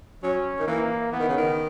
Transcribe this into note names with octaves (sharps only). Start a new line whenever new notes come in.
F#3 C#4
D#3
E3 A#3
E3 B3
D#3
C#3
D#3